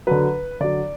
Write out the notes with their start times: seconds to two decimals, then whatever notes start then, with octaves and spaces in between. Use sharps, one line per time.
0.07 D3 F#3 B4
0.60 D3 F#3 D5